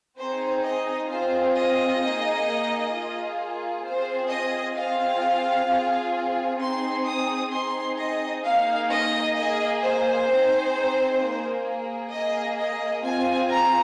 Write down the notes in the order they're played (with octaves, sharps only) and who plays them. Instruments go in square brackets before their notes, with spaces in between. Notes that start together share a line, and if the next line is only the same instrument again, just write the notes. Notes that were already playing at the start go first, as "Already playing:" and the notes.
[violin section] C4 D#4 G#4 C5
D#5
C4 F4 G#4 C5
D#5
A#3 D#4 G#4
A#3 F4 G#4
C4 F4 G#4 C5
D#5
C4 F4 G#4 F5
C4 F4 G#4
C4 D#4 G#4 C6
D#6
C4 D#4 G#4 C6
D#5
A#3 D#4 G#4 F5
D#5
A#3 G#4 D#5
C5
C4 D#4 G#4
A#3 G#4
A#3 G#4 D#5
D#5
C4 F4 G#4 G#5
A#5